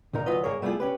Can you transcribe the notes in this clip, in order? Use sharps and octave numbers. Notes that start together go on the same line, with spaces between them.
C#2 A#2 D#4 A#4
D2 F#3 F4 B4 D#5
G2 A#3 G#4 A#4 C#5
G3 A3 B3 E4 F4 G#4
C#4 G4 B4